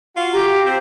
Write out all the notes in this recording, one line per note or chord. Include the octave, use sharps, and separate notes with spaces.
F4 F#4
G4 A#5
C4